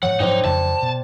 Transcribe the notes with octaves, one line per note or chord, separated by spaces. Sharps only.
G#2 E3 F3 C#5 F#5
G#2 F3 F#3 D#4 C5 D5 G5
F2 C#3 E3 A5
B2